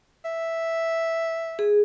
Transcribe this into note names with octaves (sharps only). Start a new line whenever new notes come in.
E5
G#4